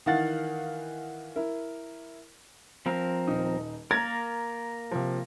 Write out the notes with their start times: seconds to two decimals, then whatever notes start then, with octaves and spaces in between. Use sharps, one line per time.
0.06 D#3 E3 F5 F#5 A6
1.36 E4 A#4
2.86 F3 C4 A#4
3.27 D#1 D#4
3.91 A#3 A#4 A#5 G#6 A6
4.91 C3 F3